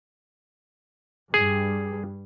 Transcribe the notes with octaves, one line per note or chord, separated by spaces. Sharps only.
G2 G3 G#4